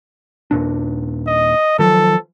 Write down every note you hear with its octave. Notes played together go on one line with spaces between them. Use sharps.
D#2 A#2 D4
D#5
D#3 F3 F#3 A4